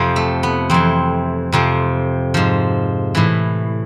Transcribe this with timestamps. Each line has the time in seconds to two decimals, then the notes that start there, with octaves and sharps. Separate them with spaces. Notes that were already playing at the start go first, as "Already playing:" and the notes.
Already playing: F2 C3 F3
0.16 A3
0.43 B3
0.70 F2 E3 C4
1.52 F2 C3 F3
2.34 G#2 F3
3.15 A2 E3